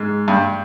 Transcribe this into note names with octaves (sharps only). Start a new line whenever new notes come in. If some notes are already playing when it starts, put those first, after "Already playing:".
Already playing: G#2
G2